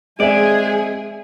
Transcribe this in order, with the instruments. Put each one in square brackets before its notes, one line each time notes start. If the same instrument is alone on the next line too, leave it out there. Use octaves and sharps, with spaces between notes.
[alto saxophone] G#3 [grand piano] C4 E5 [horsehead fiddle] G#4 G#5 [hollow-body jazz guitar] D5